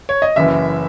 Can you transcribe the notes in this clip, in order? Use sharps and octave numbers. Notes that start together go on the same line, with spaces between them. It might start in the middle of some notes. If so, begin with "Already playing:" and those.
C#5
D#5
F#1 F#2 E3 E5